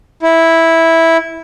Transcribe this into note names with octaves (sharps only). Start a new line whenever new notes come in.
E4